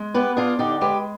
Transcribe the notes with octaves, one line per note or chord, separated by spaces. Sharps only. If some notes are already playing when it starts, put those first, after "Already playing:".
Already playing: G#3
B3 G4 B4
D4 F4 G#4
D3 D#4 G4
G#3 G4 B4